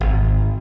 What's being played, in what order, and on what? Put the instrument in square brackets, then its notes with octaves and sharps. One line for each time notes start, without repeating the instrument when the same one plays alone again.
[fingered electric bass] G#1